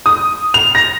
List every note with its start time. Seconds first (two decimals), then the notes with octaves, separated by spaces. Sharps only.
0.06 D#6
0.54 F7
0.75 A#6